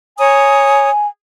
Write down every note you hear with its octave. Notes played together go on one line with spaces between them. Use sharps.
C#5 G#5 A#5 D#6